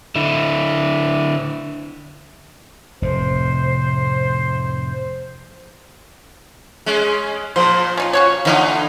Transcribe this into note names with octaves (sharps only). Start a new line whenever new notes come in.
D3 E4
F1 F2 A2 C5
G#3 C#4
A#2 F3 C5
C#4 D#4 F4
C#4 F#4 C#5
D3 E3 A#3 C#4 D#4 F4